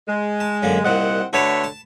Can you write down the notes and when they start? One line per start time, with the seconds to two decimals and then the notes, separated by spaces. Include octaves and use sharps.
0.08 G#3
0.40 A5
0.62 F#2 D3 A#3
0.85 C2 A#2 C4 D#5 F#5
1.33 D3 A3 F#4 B4 C#5 A5
1.64 A5